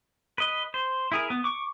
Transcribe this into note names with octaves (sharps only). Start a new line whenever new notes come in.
B4 D#5
C5
E4 G#4 A#4
B3
C#6 D6